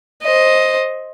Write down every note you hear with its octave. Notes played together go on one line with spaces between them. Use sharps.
C5 D#5